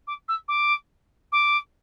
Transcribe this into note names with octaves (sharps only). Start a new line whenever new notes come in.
D6
E6
D6
D6